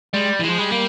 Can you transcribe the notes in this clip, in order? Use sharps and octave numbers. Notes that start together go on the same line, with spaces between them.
G3 G#3
E3
F3 G#3
G3
A#3